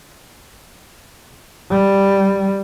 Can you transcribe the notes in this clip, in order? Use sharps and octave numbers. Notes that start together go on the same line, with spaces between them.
G3